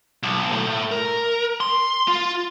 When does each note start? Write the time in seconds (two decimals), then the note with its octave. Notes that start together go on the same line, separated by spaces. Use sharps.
0.23 B1
0.52 A2
0.91 A#4
1.61 C6
2.08 F4